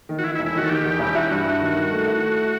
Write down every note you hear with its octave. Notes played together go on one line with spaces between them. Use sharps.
D#3
F#4
D#3 E4
E4
E1
E4
D#3 F#4
A4
D#3 G4
E2
E1
E4 F#4
G4
G2 F#4
G2
D#3
D#3
A3
E4
A3